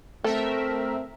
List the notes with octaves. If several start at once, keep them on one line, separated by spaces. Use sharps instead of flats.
A3 C4 A4 A#4 E5